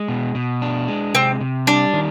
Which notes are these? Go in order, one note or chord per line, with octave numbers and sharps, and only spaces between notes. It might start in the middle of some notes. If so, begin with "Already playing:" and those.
Already playing: G#3
B2
B2
D4
G#3
C3 C4
C3
G3 D4
D#3